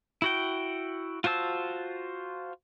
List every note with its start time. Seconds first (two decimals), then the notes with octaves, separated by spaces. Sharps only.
0.22 E4 F#4 G5
1.24 F4 F#4 C5 A5 E6